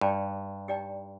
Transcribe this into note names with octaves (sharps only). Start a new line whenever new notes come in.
G2 D#4 G4 D5 G5 A#5
D#4 G4 D5 G5 A#5